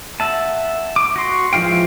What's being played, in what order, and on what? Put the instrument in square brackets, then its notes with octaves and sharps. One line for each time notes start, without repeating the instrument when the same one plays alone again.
[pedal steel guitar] E5 F#5 A5
D6
F#4 C6
E3 F3 G#3 F5 G5